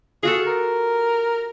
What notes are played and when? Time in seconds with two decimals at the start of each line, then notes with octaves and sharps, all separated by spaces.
0.23 F4 F#4 G#4 A4
0.47 A#4